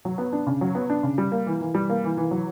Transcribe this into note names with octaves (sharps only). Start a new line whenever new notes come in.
F#3
B3
D4
C#3
F#3
B3
D4
C#3
G3
A#3
E3
E3
G3
A#3
E3
E3
F#3